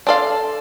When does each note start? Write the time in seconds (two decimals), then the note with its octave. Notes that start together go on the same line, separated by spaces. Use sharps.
0.07 D4 A4 D5 F5 C6
0.30 A5